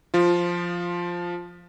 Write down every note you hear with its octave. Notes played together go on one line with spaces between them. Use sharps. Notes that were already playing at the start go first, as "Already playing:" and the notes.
F3 F4